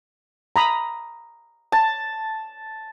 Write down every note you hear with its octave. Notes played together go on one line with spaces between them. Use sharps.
A#5 B5 D#6
A5